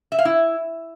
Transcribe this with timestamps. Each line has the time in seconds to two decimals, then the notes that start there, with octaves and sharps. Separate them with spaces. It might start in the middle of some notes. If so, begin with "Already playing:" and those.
0.12 E5
0.19 F5
0.25 E4